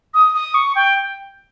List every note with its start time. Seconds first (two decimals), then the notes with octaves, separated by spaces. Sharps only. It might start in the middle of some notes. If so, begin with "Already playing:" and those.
0.14 D#6
0.34 D#6
0.54 C#6
0.75 G5